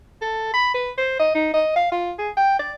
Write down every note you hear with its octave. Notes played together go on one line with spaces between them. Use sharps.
A4
B5
B4
C5
D#5
D#4
D#5
F5
F4
G#4
G5
D5